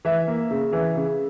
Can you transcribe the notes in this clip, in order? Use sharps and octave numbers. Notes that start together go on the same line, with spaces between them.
E3 E5
A#3
C#3
E3
C#3